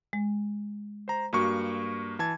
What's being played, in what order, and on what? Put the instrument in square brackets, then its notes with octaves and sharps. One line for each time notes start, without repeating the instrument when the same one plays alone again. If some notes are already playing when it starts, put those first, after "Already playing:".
[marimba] G#3
[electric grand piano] C5 A#5
[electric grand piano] G2 A#3 C#6 [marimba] F#4
[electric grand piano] E3 A5 G#6